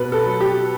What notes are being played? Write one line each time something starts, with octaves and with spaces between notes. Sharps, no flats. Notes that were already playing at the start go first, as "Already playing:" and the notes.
Already playing: B2 B4
A4
F#3
G4